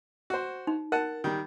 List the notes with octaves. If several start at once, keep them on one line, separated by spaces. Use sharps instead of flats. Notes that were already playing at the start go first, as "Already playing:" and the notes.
F#4 C5
D#4
A#4 F#5 A5
D#3 G3